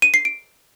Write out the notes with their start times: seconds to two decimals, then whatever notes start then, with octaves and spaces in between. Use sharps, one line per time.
0.02 D#7
0.14 C7
0.25 D7